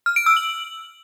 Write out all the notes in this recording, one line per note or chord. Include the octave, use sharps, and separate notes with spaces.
F6
D7
E6
F#7